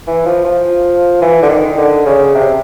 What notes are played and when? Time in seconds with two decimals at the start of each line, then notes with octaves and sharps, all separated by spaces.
0.08 E3
0.26 F3
0.45 F3
1.22 E3
1.43 D3
1.49 D#3
1.78 D3
2.06 C#3
2.35 C3